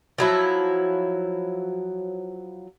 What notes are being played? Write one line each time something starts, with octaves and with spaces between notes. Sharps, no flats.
F3 F#3 E4